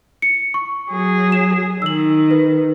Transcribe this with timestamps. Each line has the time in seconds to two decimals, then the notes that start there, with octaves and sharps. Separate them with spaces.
0.22 C#7
0.54 C#6
0.91 F#3 G#4
1.32 E7
1.82 D#3 E6 F#7
2.31 B4